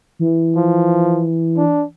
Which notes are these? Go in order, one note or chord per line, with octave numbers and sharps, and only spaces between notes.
E3
F3
D4